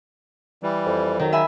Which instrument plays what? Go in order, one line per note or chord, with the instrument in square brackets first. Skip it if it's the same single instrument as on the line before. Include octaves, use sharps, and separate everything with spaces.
[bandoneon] E3 G3
[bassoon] F2
[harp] D#3 [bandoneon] F#3
[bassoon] C#3 [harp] E5 G#5 B5